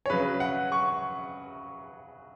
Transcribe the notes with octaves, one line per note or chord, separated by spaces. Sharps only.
C#5
C#3 F#3 B4
F#5
C#6